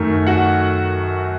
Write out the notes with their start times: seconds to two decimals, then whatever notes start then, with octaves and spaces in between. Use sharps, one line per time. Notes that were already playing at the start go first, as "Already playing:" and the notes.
Already playing: F#2 D#3 A3
0.27 F#4 F#5